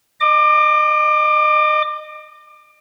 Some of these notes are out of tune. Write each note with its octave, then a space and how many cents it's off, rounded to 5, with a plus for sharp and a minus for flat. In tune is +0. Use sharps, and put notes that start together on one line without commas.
D#5 -25 D6 +25